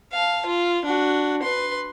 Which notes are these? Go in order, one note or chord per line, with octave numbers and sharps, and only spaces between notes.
F5 A5
F4
D4 F#4
B4 C6